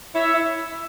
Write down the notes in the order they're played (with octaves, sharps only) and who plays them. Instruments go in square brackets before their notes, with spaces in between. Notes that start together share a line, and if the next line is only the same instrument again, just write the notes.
[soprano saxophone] E4 [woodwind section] C#5 E5
[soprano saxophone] E4